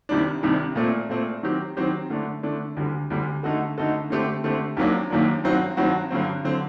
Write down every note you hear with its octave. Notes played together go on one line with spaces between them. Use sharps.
C2 C3 D#3 G3 D4
C2 C3 D#3 G3 D4
A#2 A3 C4
A#2 A3 C4
D#3 F#3 C4 G4
D#3 F#3 C4 G4
D3 A3 D4
D3 A3 D4
D2 D3 G3
D2 D3 G3
D3 A3 D#4 F#4 A4
D3 A3 D#4 F#4 A4
D3 A3 C4 G4
D3 A3 C4 G4
D#2 D#3 F#3 A#3 D4
D#2 D#3 F#3 A#3 D4
G2 D#3 F#3 C4 F#4
G2 D#3 F#3 C4 F#4
G2 D3 F#3 C4
D3 F#3 C4